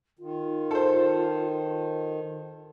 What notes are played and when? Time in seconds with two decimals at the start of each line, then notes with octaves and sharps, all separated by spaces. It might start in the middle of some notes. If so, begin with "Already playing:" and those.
0.19 D#3 F4
0.71 A4 C5